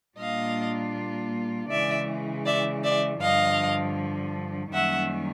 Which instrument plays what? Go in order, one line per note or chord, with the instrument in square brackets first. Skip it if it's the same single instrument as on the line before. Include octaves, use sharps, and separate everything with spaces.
[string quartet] A#2 G3 A#3 D4 F4 D#5 F5
C#3 E3 G#3 D5 E5
D5 E5
D5 E5
G2 D3 F3 D#5 F5
F#2 D#3 G3 A#3 C#4 E5 F#5